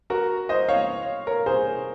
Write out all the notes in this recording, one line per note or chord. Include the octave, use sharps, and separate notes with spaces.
F#4 A#4
C5 D#5
C#5 F5
A#4 C#5
G#4 C5